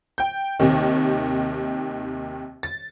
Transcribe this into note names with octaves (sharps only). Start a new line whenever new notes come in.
G5 G6
D#2 C3 D#3
A6